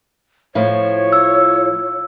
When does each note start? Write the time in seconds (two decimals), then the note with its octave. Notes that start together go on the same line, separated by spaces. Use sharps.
0.55 A2 F3 C#5
1.13 E6